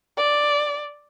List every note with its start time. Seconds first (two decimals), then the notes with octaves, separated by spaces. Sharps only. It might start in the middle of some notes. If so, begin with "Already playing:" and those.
0.18 D5